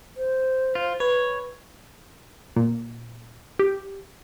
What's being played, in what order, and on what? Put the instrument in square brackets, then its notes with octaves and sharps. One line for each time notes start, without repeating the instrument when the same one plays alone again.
[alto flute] C5
[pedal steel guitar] F4
[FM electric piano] B4 [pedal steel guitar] C#5
[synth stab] A#2
G4